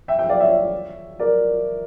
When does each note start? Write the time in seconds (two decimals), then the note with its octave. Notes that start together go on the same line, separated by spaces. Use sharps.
0.08 E5 G5
0.19 E5 G5
0.29 D5 F5
0.40 C#5 E5
1.20 A#4 D5